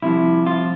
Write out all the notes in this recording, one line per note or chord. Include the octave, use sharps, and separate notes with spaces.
C2 C3 F3 E4
F4